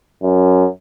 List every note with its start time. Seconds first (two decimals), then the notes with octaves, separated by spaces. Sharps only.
0.23 F#2